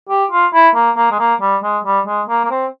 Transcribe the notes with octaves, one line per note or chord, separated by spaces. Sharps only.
G4
F4
E4
A#3
A#3
G#3
A#3
G3
G#3
G3
G#3
A#3
A#3
C4